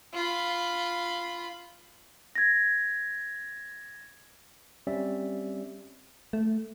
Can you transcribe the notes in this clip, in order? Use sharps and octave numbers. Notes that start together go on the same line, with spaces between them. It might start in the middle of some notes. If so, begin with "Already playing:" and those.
F4 B5
G#6 A#6
G3 C4 C#4 G4 D5 E5
A3